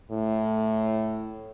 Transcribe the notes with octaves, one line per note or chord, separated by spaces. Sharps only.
A2